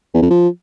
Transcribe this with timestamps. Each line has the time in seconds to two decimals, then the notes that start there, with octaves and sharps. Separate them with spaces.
0.14 E2
0.22 F2
0.30 F3